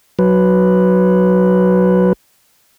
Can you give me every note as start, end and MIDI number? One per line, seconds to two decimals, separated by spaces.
0.19 2.13 54
0.19 2.13 71